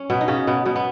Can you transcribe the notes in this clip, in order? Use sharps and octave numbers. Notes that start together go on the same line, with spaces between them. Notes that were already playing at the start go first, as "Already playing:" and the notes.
Already playing: C#4
B2 B3
D#4
C#3 C#4
B2 B3
B2 B3
B3